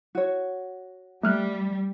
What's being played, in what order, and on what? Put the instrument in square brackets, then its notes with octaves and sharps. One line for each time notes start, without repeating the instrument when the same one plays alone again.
[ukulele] F#4 C#5
[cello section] G3 [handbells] A3 F6 F#6